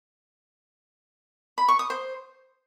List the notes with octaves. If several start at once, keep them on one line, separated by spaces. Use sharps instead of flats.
B5
C#6
D#6
C5